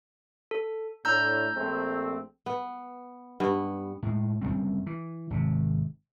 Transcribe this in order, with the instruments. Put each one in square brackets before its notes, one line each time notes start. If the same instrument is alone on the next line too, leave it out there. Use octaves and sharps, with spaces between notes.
[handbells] A4
[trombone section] A2 D4 [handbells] A#5 E6 G6
[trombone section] A#1 A3 C4
[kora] B3
G2 B3
[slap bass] A2 G#3
F#1 G#2 G3 C4
E3
G#1 C3